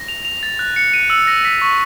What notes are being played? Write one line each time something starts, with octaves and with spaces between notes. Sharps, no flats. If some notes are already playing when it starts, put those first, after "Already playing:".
Already playing: A#6
F7
F7
A6
F#6
C#7
D#7
E6
A#6
B6
C#6